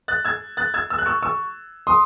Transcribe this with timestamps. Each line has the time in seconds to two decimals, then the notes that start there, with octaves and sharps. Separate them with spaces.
0.08 F#6 A6
0.25 E6 G#6
0.57 F#6 A6
0.74 E6 G#6
0.90 E6
0.98 F#6
1.06 C#6 E6
1.23 C#6 E6
1.87 C6 D#6